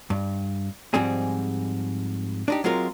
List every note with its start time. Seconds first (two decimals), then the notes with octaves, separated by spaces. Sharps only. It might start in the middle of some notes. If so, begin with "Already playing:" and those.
0.10 G2
0.94 G#2 F3 G3 G#3 C4 G#4
2.48 D4 D#4 G4
2.64 F#3 G#3 C4 F4 A#4